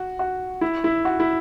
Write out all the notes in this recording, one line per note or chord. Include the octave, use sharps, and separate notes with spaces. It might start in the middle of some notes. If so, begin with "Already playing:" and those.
Already playing: F#4
F#4
E4
E4
F#4
E4